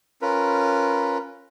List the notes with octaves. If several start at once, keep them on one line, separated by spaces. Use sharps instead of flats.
C#4 F4 A#4 B4